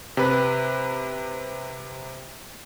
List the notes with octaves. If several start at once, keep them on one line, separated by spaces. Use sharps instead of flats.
C3 B4